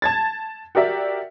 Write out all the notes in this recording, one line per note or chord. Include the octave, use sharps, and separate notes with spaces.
A5 G#6 A6
F#4 G4 A#4 D5 E5